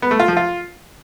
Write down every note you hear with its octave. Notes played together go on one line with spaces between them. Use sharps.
B3
A3
F4
F3
F4